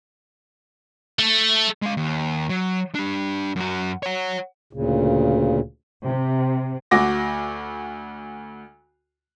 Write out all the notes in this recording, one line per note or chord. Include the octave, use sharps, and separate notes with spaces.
A3
G#3 F5
D#2
F#3
D4 G4
F#2 F#4
C#5 F#5
D2 A#2 C#3
C3
D2 F#4 D6 A#6